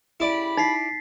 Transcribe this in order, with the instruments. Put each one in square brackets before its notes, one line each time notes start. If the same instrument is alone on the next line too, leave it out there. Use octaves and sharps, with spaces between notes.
[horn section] C#3 G4 B5 [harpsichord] E4 D5
[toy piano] D#4 [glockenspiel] A6 B6 C7